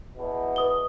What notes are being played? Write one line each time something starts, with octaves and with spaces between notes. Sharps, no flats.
E2 B2
B4 D#6 G7